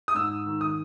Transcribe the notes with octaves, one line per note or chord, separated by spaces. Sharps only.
D#6
G#2 E6
D#3
D#6